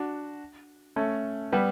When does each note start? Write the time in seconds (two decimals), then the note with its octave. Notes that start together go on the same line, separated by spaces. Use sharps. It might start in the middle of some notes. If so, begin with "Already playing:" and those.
Already playing: D4 F#4
0.96 A3 C#4
1.52 G3 B3